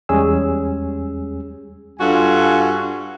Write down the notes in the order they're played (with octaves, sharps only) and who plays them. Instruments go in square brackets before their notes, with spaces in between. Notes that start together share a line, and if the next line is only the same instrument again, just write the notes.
[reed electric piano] E2 G3 G#3 C#4 G#4 E6
[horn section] G2 F4 F#4 A4 G#5